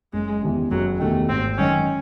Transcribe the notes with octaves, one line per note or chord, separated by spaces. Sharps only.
F#1 G#3
E2 C3 D#3
F#1 F#3
E2 C3 D#3 A3
G#1 C4
F#2 D#3 G#3 C#4 D#4